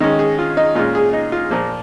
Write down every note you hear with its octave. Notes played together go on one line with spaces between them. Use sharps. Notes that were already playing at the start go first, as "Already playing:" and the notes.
D#3 G#3 C#4 D#4
G#4
F4
D#4
A#2 G#3 C#4 F4
G#4
D#4
F4
A#2 F3 A#3